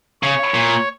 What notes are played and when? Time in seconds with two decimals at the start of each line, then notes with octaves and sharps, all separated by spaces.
0.22 C#3 C#5
0.54 A#2